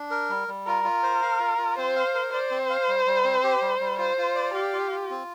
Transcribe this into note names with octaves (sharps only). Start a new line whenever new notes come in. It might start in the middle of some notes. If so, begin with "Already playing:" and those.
Already playing: D4
A#4
G3
G3
F4 A#4
F4
C5
F5
F4
F4
C4 C5
F5
A#4
C5 D5
C4
F5
G3
G3
C4
G4
G3
G3
F4 C5
F4
D5
G4 F5
F4
F4
C4